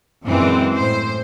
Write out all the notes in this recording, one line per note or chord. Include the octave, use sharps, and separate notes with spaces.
F#2 A#2 E3 G#3 C4
A2 C5